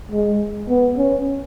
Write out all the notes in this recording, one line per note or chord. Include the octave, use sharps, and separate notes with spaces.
G#3
B3
C#4